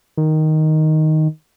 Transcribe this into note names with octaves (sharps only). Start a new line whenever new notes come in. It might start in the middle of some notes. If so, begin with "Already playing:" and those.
D#3